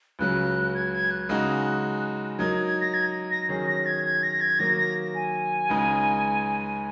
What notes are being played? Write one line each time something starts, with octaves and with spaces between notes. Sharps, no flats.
C#2 C#3 F#3 F#6
G#6
G#6
F#6
C#3 G#3 D#4 F#4
F#3 D#4 A#4 G#6
G#6
A#6
G#6
A#6
D#3 F#3 C#4 G#4
A#6
G#6
G#6
A#6
G#6
D#3 F#3 A#3 A#6
A#6
G#5
C#2 C#3 G#3 D#4